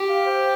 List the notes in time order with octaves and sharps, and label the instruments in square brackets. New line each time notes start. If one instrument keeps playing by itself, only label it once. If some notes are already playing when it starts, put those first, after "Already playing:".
Already playing: [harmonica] G4
[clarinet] F5
C5